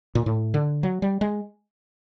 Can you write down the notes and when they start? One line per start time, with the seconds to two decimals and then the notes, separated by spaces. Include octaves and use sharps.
0.15 A#2
0.26 A2
0.54 D3
0.83 F#3
1.02 G3
1.21 G#3